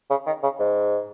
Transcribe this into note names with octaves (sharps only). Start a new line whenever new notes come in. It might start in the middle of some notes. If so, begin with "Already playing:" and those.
C#3
D#3
C#3
G#2